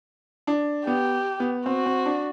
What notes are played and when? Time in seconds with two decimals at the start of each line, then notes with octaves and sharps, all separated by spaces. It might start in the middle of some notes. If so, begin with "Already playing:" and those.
0.47 D4
0.86 B3 G4
1.40 B3
1.66 C4 F#4
1.86 C4
2.06 D4